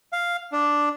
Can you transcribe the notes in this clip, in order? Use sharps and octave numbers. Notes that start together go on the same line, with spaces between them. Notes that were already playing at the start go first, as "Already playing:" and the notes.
F5
D4